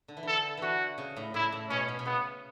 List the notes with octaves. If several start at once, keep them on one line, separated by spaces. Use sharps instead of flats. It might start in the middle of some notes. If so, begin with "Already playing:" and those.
D3
E3
D3 A4
D3 E3 F#4
C#3
A2
A2 E4
A2
B2 C#4
B2
B2
C#3 B3